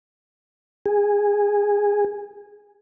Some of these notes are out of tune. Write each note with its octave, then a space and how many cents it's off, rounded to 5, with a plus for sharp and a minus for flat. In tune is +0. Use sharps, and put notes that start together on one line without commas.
G#4 -15